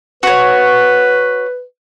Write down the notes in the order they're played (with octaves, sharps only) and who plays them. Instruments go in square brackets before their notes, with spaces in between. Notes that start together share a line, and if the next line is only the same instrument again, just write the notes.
[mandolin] F#4 C#5 [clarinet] B4